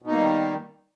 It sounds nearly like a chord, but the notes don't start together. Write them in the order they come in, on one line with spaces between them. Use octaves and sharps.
B2 D#4 A#3 G3 D#3